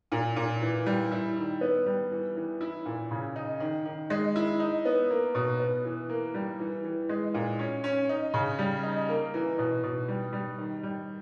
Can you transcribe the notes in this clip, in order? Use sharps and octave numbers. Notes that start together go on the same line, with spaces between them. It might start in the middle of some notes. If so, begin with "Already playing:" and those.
A#2
A#2
E3
G3
E4
D#3
B3
G3
E3
E3
E4
A#2
C#3
D#4
D#3
D#3
G#3
E4
D#4
B3
A#3
B2
B3
E3
A#3
G3
E3
E3
G#3
A#2
C#4
C#4
D#4
C#3
G3
D#4
A#3
E3
B2
B2
G3
G3
D#3
G3